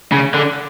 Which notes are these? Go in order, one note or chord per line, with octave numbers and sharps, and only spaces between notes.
C#3
D3